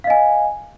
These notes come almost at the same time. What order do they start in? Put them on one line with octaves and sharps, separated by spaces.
F5 D#5 G#5